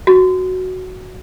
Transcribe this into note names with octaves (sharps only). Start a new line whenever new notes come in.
F#4